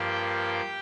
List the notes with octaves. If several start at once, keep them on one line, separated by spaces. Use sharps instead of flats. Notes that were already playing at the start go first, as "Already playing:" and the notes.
Already playing: G2 F3 A#3 G4 G5